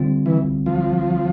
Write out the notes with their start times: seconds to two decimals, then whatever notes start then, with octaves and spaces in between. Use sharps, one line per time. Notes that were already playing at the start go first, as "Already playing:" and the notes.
Already playing: D3 G3 C4 F4
0.26 E3
0.66 F3